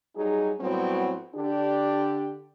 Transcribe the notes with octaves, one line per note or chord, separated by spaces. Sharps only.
F#3 G3 D#4 G#4
A2 F#3 G3 B3 C4 F#4
D3 D4 G4